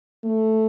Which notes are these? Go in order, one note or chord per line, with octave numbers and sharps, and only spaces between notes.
A3